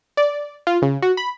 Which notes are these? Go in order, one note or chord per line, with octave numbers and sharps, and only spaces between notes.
D5
F4
C#3
F#4
B5